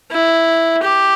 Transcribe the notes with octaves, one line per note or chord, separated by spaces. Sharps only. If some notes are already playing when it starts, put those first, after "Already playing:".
E4
G4